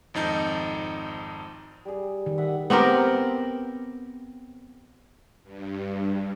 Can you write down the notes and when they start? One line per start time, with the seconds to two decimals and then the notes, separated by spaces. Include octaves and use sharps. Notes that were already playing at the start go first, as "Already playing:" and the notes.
0.14 G#1 F2 D#4 G6
1.85 G3 G#4
2.26 D#3
2.38 E5 F#5 D#6
2.70 B3 C4 G4 A#4
5.44 G2